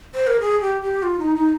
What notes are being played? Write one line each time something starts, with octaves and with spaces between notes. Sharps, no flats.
C5
A#4
G#4
G4
G4
F4
D#4
D#4